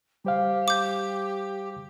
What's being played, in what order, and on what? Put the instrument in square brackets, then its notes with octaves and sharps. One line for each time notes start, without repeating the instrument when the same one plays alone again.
[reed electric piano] G3 C5 F5 [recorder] G4
[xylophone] D6 G6